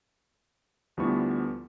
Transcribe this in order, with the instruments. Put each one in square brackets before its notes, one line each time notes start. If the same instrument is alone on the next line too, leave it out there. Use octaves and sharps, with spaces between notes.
[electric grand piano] D2 F3 G3 B3 E4 C#6